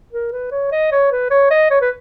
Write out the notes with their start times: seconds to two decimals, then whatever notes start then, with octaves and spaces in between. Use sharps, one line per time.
0.13 A#4
0.32 B4
0.52 C#5
0.72 D#5
0.92 C#5
1.12 B4
1.30 C#5
1.51 D#5
1.71 C#5
1.81 B4